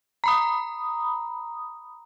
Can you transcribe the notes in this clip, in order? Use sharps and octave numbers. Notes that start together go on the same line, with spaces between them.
A#5 B5 D#6